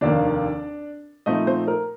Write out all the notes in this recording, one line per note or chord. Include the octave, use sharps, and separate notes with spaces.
F1 D#2 D#3 A#3 D4 D5
A#2 F3 A3 C4 D#4 D#5
C4 C5
A#4